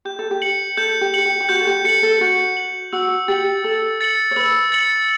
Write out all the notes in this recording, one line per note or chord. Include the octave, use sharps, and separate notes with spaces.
G4 G6
A4
G4
C#7 F#7
A4 G6
G4
C#7 F#7
G4
G4
F#4 G6
A4
G4
A4 C#7 F#7
A4
F#4 G6
C#7 F#7
F#4 E6
G4 A6 C#7 F#7
A4 E6
A6 C#7 F#7
C#5
B4 E6
A6 C#7 F#7